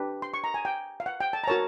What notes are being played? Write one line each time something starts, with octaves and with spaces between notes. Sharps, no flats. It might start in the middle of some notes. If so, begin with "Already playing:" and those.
Already playing: D4 G4 B4
C6
C#6
A#5
G#5
G5
F5
F#5
G5
A5
A#5
F#4 A#4 C#5 A5